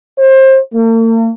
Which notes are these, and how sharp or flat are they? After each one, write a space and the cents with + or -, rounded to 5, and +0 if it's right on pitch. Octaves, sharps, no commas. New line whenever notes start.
C5 +25
A#3 -45